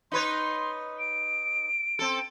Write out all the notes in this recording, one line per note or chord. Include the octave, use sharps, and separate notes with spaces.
D#4 B4 C#5 C6
D7
C4 A4